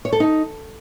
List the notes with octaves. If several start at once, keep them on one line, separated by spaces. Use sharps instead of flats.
C#5
A4
D#4